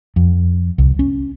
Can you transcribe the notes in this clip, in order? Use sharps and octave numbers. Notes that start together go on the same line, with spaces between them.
F2
C2
C#4